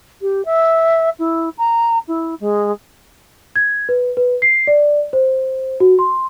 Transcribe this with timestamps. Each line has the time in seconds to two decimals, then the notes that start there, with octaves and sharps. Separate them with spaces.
0.21 G4
0.45 E5
1.19 E4
1.58 A#5
2.08 E4
2.40 G#3
3.56 G#6
3.89 B4
4.17 B4
4.42 C7
4.67 D5
5.13 C5
5.80 F#4
5.99 C6